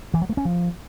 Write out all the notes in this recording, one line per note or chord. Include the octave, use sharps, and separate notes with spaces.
E3
F#3
A3
C#4
F3